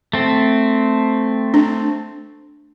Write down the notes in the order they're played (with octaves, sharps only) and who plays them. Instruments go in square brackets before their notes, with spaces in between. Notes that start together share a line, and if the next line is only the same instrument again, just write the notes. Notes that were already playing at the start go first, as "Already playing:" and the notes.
[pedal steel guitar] A3 C4
[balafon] D4